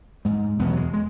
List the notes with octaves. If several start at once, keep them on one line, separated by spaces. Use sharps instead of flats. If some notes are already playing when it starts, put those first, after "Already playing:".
G#2 G#3
E2 B2 B3
F#3
G#3
G#3